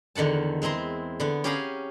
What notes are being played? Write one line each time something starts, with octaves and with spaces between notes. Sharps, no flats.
E2 D3 D#3 F#5 A5
G#3 C4 E4 A#5 C6
D3 B3
C#4 G4 G#4 F5 A#5 B5